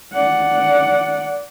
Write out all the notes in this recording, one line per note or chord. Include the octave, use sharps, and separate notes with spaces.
D5 F#5